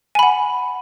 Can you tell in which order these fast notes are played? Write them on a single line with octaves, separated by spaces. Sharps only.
G#5 B5 F#5